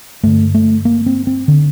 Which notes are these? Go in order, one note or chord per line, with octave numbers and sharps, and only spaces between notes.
G2 D3 A3
A3
A#3
C4
C4
D3